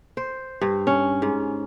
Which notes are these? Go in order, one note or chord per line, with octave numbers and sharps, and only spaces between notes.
C5
G2
C#4
G#2